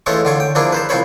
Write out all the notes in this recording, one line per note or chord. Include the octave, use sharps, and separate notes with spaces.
E3 G#3 A3 C#4 F4 A4
D3 F4 C#5
G5
F3 A#3 D4 E4 G#4
B4 C5 A5
C2 F3 F4 C5 C#5 B5